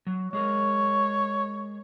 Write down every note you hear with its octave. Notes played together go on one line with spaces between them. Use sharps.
F#3
G#3 G#4 A#4 C#5